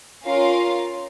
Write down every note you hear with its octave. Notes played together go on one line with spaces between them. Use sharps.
C#4 F4 A#4 F5